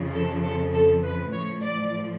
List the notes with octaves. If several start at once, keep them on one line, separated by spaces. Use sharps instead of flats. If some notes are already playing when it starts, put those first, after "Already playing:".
Already playing: F2 C#3 F3
A4
A4
A4
B4
A2 F3 C#5
D5